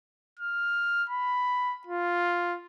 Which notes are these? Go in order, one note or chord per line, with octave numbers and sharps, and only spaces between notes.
F6
B5
F4